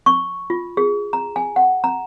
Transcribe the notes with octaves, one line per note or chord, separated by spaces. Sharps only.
C#6
F4
G#4
A#5
G#5
F#5
A#5